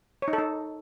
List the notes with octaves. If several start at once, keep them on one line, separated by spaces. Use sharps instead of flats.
C#5
D#4
A4
D#4